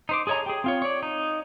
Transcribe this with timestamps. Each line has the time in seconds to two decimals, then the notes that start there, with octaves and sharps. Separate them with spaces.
0.09 D#4 C5 D6
0.27 G#4 A4 C#5 D#5 A#5
0.46 G4 G#4
0.64 C4 F4 C#5
0.82 C#5 D5
1.03 D#4